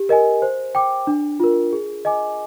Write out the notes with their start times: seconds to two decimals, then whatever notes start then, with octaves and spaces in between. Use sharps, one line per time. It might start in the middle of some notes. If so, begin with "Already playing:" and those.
Already playing: G4
0.09 A#4 D#5 G#5
0.42 C5
0.75 G5 D6
1.07 D4
1.40 F4 A#4
1.73 G#4
2.05 D#5 G#5 D6